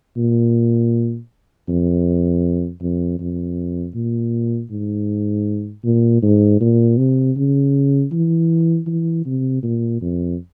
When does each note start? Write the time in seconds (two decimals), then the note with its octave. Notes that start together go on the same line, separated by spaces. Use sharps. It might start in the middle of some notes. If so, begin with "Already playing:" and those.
0.17 A#2
1.68 F2
2.82 F2
3.20 F2
3.95 A#2
4.71 G#2
5.84 A#2
6.23 G#2
6.61 A#2
6.98 C3
7.37 C#3
8.12 E3
8.87 E3
9.26 C3
9.63 A#2
10.02 F2